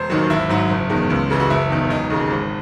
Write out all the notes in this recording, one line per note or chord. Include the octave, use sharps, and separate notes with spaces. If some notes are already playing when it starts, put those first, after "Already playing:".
Already playing: E1 C5
D#2 D#3 F#3
G#1 E4
G#2 F#3
F#1
E2 D#3 G#3
C#2
C#3 E3 G#3
F#4
F#1 E4
E2 D#3
E1 D#4
D#2 C#3 G#3
G#1